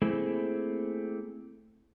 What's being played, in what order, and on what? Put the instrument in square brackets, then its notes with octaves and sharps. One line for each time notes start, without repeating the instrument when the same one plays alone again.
[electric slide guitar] A3 A#3 C4 E4 G#4